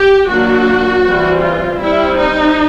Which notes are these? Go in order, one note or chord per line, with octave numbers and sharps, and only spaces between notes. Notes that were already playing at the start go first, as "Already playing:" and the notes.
Already playing: G4
D#3 F#3 A#3 D4 F#4
E3 G3 C4
F4
G3 C4 E4
D#4